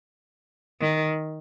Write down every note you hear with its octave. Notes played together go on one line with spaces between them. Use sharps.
D#3